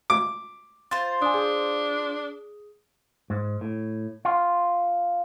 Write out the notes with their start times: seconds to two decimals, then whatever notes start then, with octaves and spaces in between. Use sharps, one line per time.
0.10 D6
0.91 F4 C5 A6
1.22 D4 G#5 D#6
1.34 G#4 D#6
3.30 G#2
3.61 A2
4.25 F4